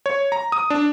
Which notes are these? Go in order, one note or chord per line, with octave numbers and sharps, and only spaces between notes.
C#5
A#5
D#6
D4